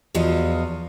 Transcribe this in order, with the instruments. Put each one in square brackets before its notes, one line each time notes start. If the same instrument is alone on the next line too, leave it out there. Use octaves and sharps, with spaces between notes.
[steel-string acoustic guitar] E2 F3 F4 F#4 D#5